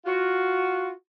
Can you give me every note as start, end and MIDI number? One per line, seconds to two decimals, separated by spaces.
0.06 0.89 65
0.06 0.89 66